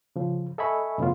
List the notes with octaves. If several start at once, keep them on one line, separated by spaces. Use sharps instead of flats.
C#3 F3
A4 D#5 E5 G#5 B5 C#6
F#2 A2 C#3 F3 B3 F4